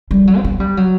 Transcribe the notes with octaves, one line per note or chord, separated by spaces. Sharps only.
G3
F#3
C4
B3
G3
F#3